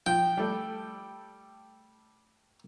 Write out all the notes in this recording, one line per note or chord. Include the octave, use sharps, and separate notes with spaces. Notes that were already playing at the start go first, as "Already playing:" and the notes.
F3 G5
G3 A3